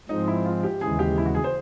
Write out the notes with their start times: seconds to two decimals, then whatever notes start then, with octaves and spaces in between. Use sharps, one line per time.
0.09 G#2 F3 G#3 C4 D#4
0.28 E4
0.45 F4
0.63 G4
0.81 D#2 C#3 E3 G#3 G#4
0.99 G4
1.18 E4
1.26 F#4
1.35 G#4
1.44 C5